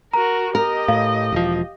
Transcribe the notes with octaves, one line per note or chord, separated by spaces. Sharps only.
F#4 A#4 A#5
G4 A#4 D#5
A2 F5
E1 F3